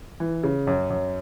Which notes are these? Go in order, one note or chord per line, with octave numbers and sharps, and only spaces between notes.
E3
C#3
F#2
F#2